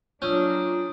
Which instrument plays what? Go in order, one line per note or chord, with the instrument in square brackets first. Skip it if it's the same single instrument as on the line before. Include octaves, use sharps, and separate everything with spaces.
[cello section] F#3 A#3 D4 [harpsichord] C#4 [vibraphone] F4 [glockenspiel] D#6 E6 G6